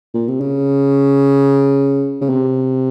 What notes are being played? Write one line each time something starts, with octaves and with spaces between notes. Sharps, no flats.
A#2
C3
C#3
C#3
C3